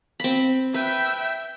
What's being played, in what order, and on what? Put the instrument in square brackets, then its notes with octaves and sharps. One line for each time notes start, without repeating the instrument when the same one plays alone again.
[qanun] C4 B5
[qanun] B4 [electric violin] E5 G5